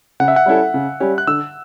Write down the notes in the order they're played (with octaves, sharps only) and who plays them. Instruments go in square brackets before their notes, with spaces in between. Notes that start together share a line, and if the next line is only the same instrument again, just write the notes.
[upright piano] C#3 [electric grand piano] F#5
[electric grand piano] E5
F#5
[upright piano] G3 C#4 E4 A4
C#3
G3 C#4 G4
[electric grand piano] F#6
[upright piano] D3 [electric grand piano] E6